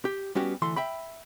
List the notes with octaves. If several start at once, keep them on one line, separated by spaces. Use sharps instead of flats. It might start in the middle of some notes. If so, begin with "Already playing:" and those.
G4
G3 B3 C#4 F#4 G4
D2 E3 A4 C6
E5 G5 B5